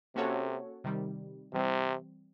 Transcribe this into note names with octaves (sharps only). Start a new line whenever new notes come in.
C3 A#3 C#4 F#4 A4 C#5
C3 D#3 G3
C3 E3 G3 C4